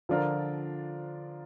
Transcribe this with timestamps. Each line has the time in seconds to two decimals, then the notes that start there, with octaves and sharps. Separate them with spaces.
0.09 D3 F3 D4 F4 A#4